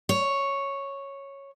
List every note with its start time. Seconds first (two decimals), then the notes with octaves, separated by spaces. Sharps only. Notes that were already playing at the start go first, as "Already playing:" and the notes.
0.09 C#5